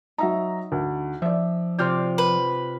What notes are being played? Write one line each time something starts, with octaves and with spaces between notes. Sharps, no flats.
F#3 D#4 E5 A#5
D2
F3 D5 E5
C3 F4 D5 C6 F6 G6
B4